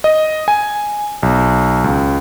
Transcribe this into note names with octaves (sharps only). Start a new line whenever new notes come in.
D#5
G#5
B1
C#2